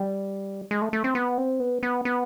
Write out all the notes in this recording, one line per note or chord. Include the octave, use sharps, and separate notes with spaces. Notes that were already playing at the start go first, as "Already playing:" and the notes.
Already playing: G3
G#3
A3
A3
C4
B3
C4
B3
B3
B3